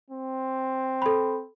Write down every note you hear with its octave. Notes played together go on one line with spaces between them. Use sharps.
C4
A4 B5